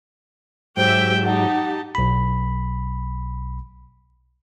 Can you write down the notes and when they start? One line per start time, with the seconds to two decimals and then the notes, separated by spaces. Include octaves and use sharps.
0.77 G#2 F#3 G4 C5 E5 G5
1.25 D#4 G4 F#5 A5
1.95 B1 B5